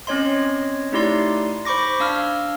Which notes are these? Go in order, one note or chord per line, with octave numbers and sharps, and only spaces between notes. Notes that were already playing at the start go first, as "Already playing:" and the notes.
C4 C#4 C#5 D#5 C6
A3 D#4 E4 G4 D5 C6
C5 B5 C#6 D6 A#6
D4 F5 E6 F6